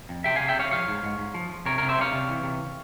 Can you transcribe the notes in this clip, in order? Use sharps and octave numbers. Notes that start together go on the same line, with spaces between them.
F2
C3 E5 G5
C3 F5 G#5
E5 G5
G3 C#5 F5
F3 C#5 F5
G#2
G#2
G#2
F3
F3
C3 A#4 C#5
C3 A#4 C#5
C5 E5
G3 C#5 F5
C3
E3
C3